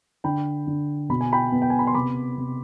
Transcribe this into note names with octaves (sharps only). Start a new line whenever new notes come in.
D3 G5 B5
D3
B2 B5
G#5
G5 B5
B3
G5
G#5
B5
C6
C3 B5 D6
C3